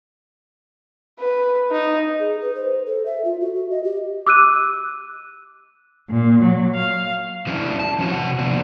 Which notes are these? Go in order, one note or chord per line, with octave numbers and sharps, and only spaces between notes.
B4
D#4
G#4
B4
C5
A4
E5
F4
F#4
F#4
D#5
G4
D6 E6 F#6 D#7
A#2
F#3
F5
E3 G3 C#4 D4 E4
A5
E3 F3 C#4 F#4 C#5
C3 F#5
D3 E3 F3 A#3 B3 D4